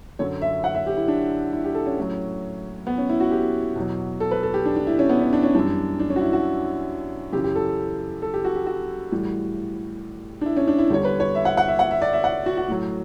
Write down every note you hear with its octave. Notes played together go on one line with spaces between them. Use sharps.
F#2 D3 F#3 C#5
E5
F#5
E5
G4
E4
D4
E4
G4
A4
C#4
A2 F#3
B3
C#4
E4
F#4
G4
E2 B2 F#3
A4
B4
A4
G4
D4
D4
E4
C#4
B3
C#4
D4
C#4
F#2 E3 G3 D4
D4
C#4
F#4
E4
F#4
F#2 C#3 E3 G4
G4
A4
A4
G4
F#4
G4
F#4
A2 E3 G3
D4
E4
C#4
D4
E4
E2 D3 G3 C#5
B4
C#5
E5
F#5
F#5
E5
F#5
E5
D5
E5
F#5
F#4
F#4
A2 F#3